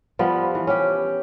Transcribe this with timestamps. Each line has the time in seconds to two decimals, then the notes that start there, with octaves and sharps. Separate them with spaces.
0.19 F3 G3 B3
0.55 E3
0.67 C#4 G4